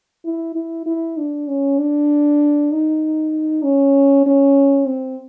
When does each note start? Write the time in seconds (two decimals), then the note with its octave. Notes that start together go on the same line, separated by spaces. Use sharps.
0.25 E4
0.55 E4
0.86 E4
1.17 D4
1.48 C#4
1.78 D4
2.72 D#4
3.64 C#4
4.26 C#4
4.87 C4